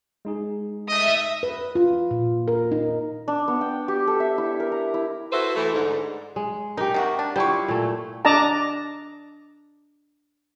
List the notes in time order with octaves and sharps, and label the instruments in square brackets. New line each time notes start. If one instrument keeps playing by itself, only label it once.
[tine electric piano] G#3 D#4 G#4
[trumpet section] A3 D#5 [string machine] E5 [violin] D#6
[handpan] B4
F4
A#2
A#4
D#4
[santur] D4
B3
G5
G4
A4
E5
E4
A#4
A#5
E4
[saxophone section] E4 F#4 A4 B4 C5 E5
E3 A3
G#2 D3
[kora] G#3
[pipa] D#4 [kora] G4 A#4
[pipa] C3 D#3 F#4
D4
[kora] G3 E4 F4 [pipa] C5 C#6
[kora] A#2 A3
[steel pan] D4 D5 D#5 A5 A#5